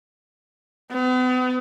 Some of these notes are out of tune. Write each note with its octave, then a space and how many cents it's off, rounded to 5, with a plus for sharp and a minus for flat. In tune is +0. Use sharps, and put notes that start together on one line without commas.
B3 +40